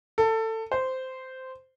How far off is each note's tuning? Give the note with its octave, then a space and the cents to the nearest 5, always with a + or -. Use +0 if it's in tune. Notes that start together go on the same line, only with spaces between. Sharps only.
A4 +20
C5 -10